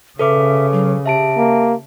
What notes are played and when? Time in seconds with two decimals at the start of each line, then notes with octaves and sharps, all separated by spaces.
0.19 C#3 A4 B4 E5 D6
0.72 F#3
1.06 G4 E5 A5 D7
1.37 A#3